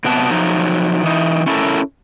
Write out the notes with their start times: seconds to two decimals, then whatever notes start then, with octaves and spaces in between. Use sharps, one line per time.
0.05 C3 F#3 B3 B4 D5 A5
0.31 F3 F#3 D#4
1.03 E3 D#4
1.46 C#4 E4 A4 A#4